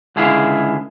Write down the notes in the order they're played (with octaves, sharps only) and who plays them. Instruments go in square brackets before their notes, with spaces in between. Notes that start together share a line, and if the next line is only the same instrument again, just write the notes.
[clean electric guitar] C#2 D3 E4 G#4 F5